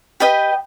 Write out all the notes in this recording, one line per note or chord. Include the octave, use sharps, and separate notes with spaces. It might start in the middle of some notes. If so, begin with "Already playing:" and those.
G4 B4 D#5 G5